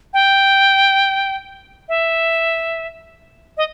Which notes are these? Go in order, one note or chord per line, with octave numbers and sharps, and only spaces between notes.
G5
E5
D#5